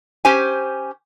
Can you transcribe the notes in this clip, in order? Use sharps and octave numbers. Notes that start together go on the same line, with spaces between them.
C#4 G4 C5 G#5